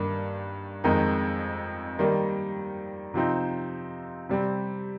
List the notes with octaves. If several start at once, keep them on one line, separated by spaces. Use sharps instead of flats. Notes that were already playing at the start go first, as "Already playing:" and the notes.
Already playing: G2 D#3 A#3 D4
F2 D#3 G#3 D#4
D#3 G3 A#3
C3 F3 C4 D#4
C3 G3 C4